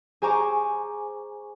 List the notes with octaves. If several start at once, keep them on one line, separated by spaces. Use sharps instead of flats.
G#4 C5 G#5 A#5 C#6 D6